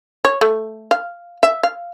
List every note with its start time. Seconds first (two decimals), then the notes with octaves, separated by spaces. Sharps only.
0.25 C#5
0.41 A3
0.91 F5
1.43 E5
1.63 F5